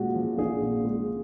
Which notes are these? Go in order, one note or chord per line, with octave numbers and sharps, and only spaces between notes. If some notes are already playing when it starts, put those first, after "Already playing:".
Already playing: A#2 G#3 F#4
F3
A#1 G#4
A#2
G#3